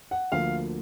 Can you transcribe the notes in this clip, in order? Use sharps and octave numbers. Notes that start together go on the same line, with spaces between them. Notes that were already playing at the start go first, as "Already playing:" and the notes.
F#5
D2 D3 F3 A#3 F5